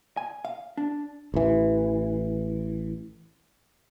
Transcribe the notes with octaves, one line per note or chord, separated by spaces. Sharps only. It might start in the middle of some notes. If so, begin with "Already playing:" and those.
G#5
F5
D4
A1 E3